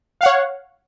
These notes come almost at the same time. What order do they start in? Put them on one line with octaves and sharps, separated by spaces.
F5 F#5 C#5